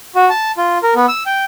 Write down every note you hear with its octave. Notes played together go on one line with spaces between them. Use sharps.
F#4
A5
F4
A#4
B3
E6
G5